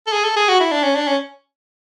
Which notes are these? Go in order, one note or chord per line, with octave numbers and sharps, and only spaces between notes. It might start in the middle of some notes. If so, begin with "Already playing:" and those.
A4
G#4
A4
G#4
F#4
E4
D4
C#4
D4
C#4